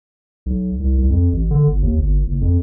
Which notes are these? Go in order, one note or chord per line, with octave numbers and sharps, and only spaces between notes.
B1
C2
C2
F2
A1
D3
G1
D#2
G1
F#1
F2